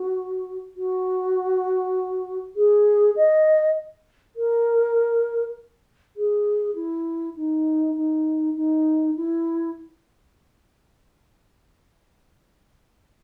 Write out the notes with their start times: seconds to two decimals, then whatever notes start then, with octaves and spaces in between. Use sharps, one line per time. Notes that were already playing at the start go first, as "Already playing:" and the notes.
Already playing: F#4
0.76 F#4
2.56 G#4
3.16 D#5
4.36 A#4
6.16 G#4
6.75 E4
7.37 D#4
7.96 D#4
8.56 D#4
9.16 E4